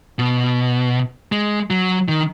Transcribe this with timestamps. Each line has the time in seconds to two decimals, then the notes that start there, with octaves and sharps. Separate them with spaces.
0.19 B2
1.32 G#3
1.70 F#3
2.08 D#3